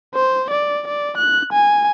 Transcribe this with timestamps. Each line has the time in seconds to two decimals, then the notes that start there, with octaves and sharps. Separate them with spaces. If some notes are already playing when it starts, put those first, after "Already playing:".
0.14 C5
0.50 D5
0.88 D5
1.17 F#6
1.53 G#5